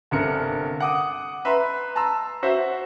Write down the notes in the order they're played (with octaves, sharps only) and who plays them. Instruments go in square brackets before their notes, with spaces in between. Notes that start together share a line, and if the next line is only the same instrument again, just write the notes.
[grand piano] G1 C3 D4 A#4 C#7
F#5 D6 D#6
B4 E5 A#5 C6
A5 A#5 C6 E6
F#4 C5 E5